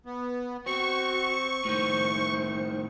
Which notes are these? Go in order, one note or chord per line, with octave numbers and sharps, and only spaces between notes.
B3
C4 F#4 C#6
A2 D#3 C5